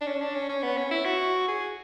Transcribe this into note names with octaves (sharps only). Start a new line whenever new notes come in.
D4
C#4
D4
C#4
C#4
B3
C#4
E4
F#4
G#4